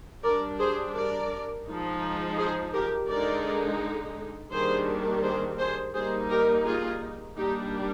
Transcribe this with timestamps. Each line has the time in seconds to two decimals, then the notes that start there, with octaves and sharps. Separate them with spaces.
0.23 G3 D4 A#4 D5
0.59 G#4 C5
0.95 A#4 D5
1.67 F3 G#3 D#4
2.38 G#4 C5
2.73 G4 A#4
3.09 D3 G#3 D#4 A#4 D5
4.52 D#3 G3 A#3 D4 G#4 C5
5.23 G#4 C5
5.59 G#4 C5
5.94 G3 A#3 D#4 G#4 C5
6.30 G4 A#4
6.66 F4 G#4
7.37 G3 A#3 D4 D#4 G4